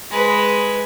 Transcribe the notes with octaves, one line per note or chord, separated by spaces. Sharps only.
G#3 B4